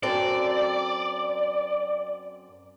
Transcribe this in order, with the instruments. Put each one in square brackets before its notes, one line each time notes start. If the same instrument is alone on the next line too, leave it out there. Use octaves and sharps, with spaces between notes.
[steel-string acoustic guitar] F#2 C4 A4 [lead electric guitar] D5